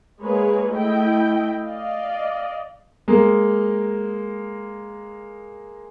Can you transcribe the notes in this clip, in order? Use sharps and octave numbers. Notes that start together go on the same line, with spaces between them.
G#3 A#3 G#4 B4 C#5
A3 E4 D#5 G5
D5 D#5 F5
G#3 A#3 A#4